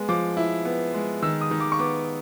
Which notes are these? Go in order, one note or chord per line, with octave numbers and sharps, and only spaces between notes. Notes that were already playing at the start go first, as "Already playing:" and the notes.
Already playing: G#3 B3
F3 D6
E4
B3
G#3
D#3 E6
D#6
D#3
D6
C#6
B3 D6